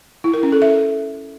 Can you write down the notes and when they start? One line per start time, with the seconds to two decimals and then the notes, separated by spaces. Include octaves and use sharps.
0.24 E4
0.34 A#4
0.43 C#4
0.52 A4
0.62 E5